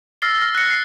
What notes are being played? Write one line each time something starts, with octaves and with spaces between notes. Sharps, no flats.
E6 F6 A6 A#6 C7 G7
F6 A#6
F#6 A#6 C#7
C7